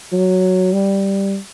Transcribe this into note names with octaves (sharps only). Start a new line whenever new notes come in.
F#3
G3